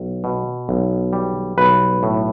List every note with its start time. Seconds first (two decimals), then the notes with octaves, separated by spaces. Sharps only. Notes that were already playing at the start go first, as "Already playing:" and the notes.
Already playing: B1
0.24 B2
0.69 B1
1.13 G3
1.58 B1 B4
2.03 A2